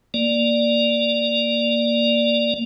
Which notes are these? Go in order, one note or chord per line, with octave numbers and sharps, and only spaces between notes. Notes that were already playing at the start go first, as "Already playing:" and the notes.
A#3 D5